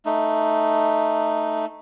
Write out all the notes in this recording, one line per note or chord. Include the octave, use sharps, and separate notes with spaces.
A3 D#4